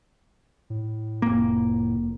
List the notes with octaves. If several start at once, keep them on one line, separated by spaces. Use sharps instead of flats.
A2
F1 A#3